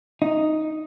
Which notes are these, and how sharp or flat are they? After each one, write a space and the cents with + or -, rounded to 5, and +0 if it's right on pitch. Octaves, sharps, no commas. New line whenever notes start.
D#4 +0